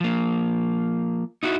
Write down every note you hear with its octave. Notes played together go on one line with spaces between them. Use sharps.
F3 A#3
D#4 E4 F#4